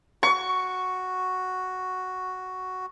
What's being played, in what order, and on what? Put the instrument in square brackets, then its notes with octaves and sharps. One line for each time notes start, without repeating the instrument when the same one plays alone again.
[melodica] F#4 [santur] C#6